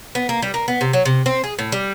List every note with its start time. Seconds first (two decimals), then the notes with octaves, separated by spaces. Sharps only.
0.15 B3
0.29 A#3
0.42 G3
0.54 A#3
0.68 B3
0.81 C3
0.93 F#3
1.05 C3
1.26 C4
1.44 G#4
1.59 A2
1.72 G3